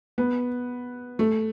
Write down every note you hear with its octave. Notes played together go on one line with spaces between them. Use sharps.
B3
A3